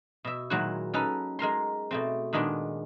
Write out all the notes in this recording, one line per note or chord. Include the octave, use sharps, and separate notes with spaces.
B2 E5
A#2 D#3 F#3 G#3 E4 F#4
C#4 D#4 A4 B4
G#3 A#4 A#5 C6
B2 A3 C4
A#2 D#3 G#3 B3 D4